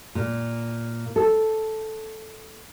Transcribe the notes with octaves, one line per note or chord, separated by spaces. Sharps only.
A#2
A4